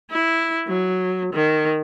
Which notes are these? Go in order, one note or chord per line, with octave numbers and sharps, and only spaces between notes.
E4
F#3
D#3